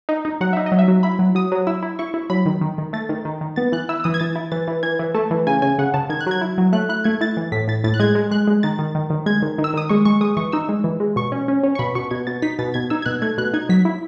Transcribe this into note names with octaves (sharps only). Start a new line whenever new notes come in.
D#4
D#4
F#3 F#5
D#4 E5
D#5
F#3
E5
F#3
E4 B5
F#3
F#3 D#6
F#3
E4 E6
E4
E4 C#6
E4
F#3 B5
D#3
D#3
D#3
A3 A6
D#3
D#3
D#3
B3 A6
E3 F#6
E4 E6
E6
E3 D#6
G#6
E3 A6
E4
E3 A6
E3
E3 G#6
E3
A3 A5
E3
C#3 G#5
C#3 G#5
C#3 F#5
C#3 A5
D#3 G#6
F#6
F#3 G#6
E4
F#3
A3 F#6
E4 F#6
A3 G#6
E4 A6
E3
A2 B6
A2 A6
A2 A6
F#6
G#3 G#6
G#3
G#3 F#6
G#3
D#3 A6
D#3
D#3
D#3
G#3 G#6
D#3
D#3
E6
D#3 D#6
G#3 C#6
G#3 C#6
G#3 D#6
E3 C#6
D#4 E6
G#3
E3
G#3
B2 C#6
C#4
C#4
C#4
C#6
B2 B5
B2 C#6
B2 G#6
B2 A6
D#4 B6
B2 A6
B2 G#6
D#4 E6
G#6
B2 F#6
A3 G#6
B2 F#6
D#4 G#6
F#3 B6
E4